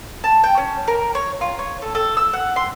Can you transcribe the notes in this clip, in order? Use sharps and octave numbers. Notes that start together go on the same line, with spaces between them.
A5
G5
C#4
A#4
C#5
F4
C#5
A4
A4
E6
F#5
C6